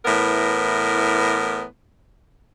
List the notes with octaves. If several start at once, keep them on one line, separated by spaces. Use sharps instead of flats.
A2 E3 B3 A#4